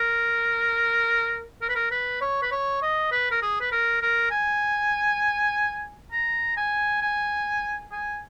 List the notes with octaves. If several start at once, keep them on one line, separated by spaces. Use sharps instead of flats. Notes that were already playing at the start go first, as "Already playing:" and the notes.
Already playing: A#4
A#4
B4
A#4
B4
C#5
B4
C#5
D#5
B4
A#4
G#4
B4
A#4
A#4
G#5
A#5
G#5
G#5
G#5